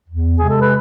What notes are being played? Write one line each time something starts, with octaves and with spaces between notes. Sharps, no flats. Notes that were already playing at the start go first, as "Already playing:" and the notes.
E2
C3 G#3 G#4
A4
B4